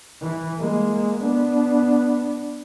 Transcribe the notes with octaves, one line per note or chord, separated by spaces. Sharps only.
E3
G#3 A#3
B3 D4